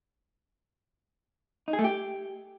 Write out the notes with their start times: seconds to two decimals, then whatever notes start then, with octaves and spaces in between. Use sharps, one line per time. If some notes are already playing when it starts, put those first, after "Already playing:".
1.68 D#4
1.73 G#4
1.79 A3
1.84 G4